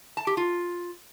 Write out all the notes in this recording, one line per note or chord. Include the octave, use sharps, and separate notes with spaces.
A5
G4
F4